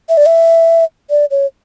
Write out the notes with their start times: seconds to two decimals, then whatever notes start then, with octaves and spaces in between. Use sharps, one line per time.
0.09 E5
0.17 D5
0.26 E5
1.10 D5
1.31 C#5